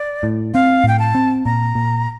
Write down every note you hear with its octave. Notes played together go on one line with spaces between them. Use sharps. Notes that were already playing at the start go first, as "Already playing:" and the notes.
Already playing: D5
A2
C4 F5
A2 G5
A5
C4
A#2 A#5
A#2